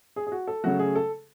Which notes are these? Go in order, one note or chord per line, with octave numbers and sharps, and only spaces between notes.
G#4
G#4
F#4
A4
C#3 F#3 A3 F#4
G#4
A4